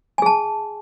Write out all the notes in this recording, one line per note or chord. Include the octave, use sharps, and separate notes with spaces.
G#4 G#5 A5